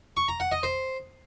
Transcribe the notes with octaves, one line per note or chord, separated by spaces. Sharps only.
C#6
A#5
F#5
D#5
C5